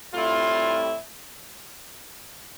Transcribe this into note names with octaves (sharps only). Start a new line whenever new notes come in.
A2 G3 C4 E4 F4